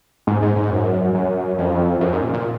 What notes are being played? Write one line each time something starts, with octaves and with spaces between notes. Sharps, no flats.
G#2
G#2
G#2
F#2
F#2
F2
F#2
G#2
A#2
A#2